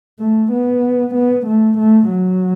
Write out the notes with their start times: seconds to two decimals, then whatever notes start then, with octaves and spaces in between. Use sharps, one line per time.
0.19 A3
0.51 B3
1.15 B3
1.46 A3
1.78 A3
2.10 F#3